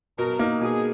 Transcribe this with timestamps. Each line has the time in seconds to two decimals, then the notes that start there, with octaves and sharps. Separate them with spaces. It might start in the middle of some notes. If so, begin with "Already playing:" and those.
0.18 B2 A#4
0.39 A#3 D#4
0.61 B2 G#4